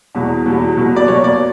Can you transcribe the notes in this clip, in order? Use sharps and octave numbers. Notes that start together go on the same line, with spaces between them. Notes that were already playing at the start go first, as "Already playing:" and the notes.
E2 B2 F#3
E2 B2 F#3
B2 F#3 A#3
D5
B2 F#3 A#3 C#5
D5